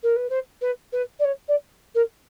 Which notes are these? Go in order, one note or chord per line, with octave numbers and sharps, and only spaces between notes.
A#4
B4
C5
B4
B4
D5
C#5
D5
A#4